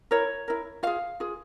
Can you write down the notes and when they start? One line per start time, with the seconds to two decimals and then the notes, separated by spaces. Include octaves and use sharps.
0.11 E4 A#4 C#5
0.48 E4 A#4
0.83 F4 G#4 F5
1.20 F4 G#4